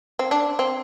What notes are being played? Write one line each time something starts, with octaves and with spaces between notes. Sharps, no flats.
C4
D4
C4